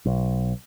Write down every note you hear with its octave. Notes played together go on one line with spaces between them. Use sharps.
B1